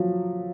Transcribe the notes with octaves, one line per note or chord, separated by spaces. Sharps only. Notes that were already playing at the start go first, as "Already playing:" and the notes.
Already playing: F3 F#3